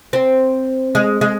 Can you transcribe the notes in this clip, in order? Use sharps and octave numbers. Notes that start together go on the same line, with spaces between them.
C4
G#3
G#3